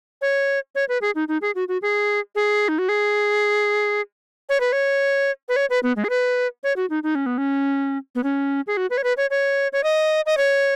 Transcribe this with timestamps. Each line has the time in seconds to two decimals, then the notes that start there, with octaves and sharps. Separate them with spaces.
0.22 C#5
0.75 C#5
0.89 B4
1.01 G#4
1.15 D#4
1.28 D#4
1.42 G#4
1.55 F#4
1.68 F#4
1.82 G#4
2.35 G#4
2.68 D#4
2.79 F#4
2.89 G#4
4.49 C#5
4.60 B4
4.72 C#5
5.49 B4
5.56 C#5
5.70 B4
5.83 B3
5.96 G#3
6.04 G#4
6.10 B4
6.63 C#5
6.76 F#4
6.90 D#4
7.03 D#4
7.15 C#4
7.26 B3
7.38 C#4
8.15 B3
8.24 C#4
8.67 G#4
8.77 F#4
8.90 B4
8.98 C#5
9.04 B4
9.17 C#5
9.30 C#5
9.73 C#5
9.84 D#5
10.26 D#5
10.37 C#5